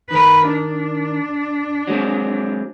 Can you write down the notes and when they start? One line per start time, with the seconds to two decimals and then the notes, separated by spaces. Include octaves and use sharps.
0.11 D#3 A#4 B4
0.52 D4
1.88 F#3 G#3 C4